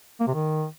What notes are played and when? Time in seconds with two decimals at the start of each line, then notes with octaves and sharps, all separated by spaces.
0.20 A#3
0.27 C3
0.34 D#3